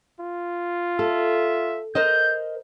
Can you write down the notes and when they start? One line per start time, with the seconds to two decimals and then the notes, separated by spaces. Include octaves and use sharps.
0.20 F4
0.99 A4 E5
1.95 A#4 C5 D#5 G6